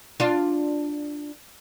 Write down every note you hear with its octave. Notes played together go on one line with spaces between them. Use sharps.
D4 F4